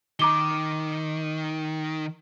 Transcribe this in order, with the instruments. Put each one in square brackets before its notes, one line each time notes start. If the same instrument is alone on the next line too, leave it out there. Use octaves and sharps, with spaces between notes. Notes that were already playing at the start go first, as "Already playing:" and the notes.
[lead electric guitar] D#3 [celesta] A#5 D6 G7